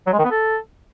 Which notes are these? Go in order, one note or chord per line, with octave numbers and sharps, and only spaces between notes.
F#3
G#3
D#3
B3
A4